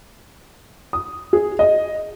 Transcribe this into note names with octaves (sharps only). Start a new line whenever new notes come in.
D#6
G#4
D#5